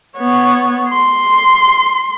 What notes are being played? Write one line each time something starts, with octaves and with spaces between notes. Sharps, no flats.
B3 C#5
C6